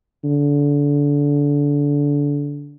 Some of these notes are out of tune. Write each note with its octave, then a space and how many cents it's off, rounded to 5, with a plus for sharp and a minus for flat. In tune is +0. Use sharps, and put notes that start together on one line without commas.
D3 -25